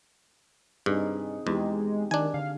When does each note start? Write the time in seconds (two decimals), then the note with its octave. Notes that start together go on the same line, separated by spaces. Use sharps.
0.86 G2 C4 D#4 G#4
1.47 E2 G#3 D#4 G4
2.11 D#3 D4 G#5
2.34 D3 F5